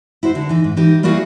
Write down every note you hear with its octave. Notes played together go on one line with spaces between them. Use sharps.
E4 F#4 C5
D3
E3 D#4
G#2
E3 D#4 G4
G3 A#3 E4 F#4 G#4 F5